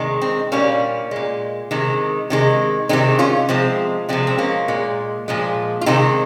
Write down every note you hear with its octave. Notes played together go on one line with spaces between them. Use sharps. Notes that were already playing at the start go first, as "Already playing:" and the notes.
Already playing: C3 D#3 G#3
C4
A#2 G3 A#3 C#4
A#2 G#3
C3 D#3 G#3
C3 D#3 G#3
C3 D#3 G#3 C4 D#4
C#4 F4
C3 F3 G#3 C4
C3 F3 G#3 C4
C4
A#3 C#4
A#2 G#3
A#2 F3 G#3
F4
C3 D#3 G#3 C4 D#4